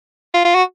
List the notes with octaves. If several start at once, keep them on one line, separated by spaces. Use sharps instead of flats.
F4
F4
F#4